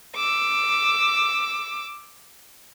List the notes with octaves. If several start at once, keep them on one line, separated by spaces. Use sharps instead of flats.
D6 E6